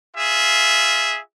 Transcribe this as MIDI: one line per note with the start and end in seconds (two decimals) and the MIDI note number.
0.16 1.19 65
0.16 1.19 68
0.16 1.19 76